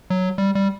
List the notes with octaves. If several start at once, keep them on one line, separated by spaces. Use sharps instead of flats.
F#3
G3
G3